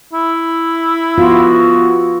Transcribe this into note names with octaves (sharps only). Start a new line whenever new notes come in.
E4
B3 F4 F#4